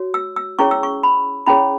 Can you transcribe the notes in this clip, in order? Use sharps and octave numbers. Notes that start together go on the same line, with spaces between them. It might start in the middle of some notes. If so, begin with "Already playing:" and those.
Already playing: F#4 C#5
E6
E6
C#4 E4 G#4 C#5 C#6
E6
C#6
B5
C#4 E4 G#4 C#5 B5